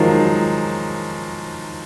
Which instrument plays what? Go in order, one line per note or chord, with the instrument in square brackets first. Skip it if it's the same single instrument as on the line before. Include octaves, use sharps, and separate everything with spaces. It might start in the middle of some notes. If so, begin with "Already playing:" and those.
Already playing: [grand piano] D#3 F3 F#3 G#3